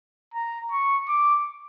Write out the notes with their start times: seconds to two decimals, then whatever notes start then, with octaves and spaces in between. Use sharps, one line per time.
0.34 A#5
0.72 C#6
1.08 D6